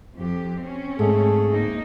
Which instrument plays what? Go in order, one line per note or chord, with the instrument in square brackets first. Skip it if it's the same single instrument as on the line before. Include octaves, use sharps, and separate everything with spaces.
[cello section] F2 G4
C4 C#4
[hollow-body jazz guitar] G#2 [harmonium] A3 G#4 A4
[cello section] D2 A#3 D#4